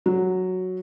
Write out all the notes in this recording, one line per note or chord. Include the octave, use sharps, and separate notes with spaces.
F#3